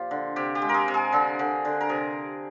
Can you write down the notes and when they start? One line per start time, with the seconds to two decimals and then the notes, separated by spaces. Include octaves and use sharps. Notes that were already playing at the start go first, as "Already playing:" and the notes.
Already playing: A#2 F3 F4 G4
0.11 D3
0.36 C3 G4
0.55 G4
0.62 G#3
0.69 A#4
0.74 G#4
0.88 C3
0.94 G#4
1.12 D3 G#4
1.39 D3
1.65 D3
1.81 A#4
1.89 C3 G#4